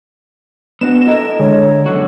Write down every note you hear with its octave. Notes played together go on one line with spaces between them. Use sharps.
B3 D4 F#4 E7
E4 A4 A#4 D#5
D3 G#3 C#5
F#2 D3 F#4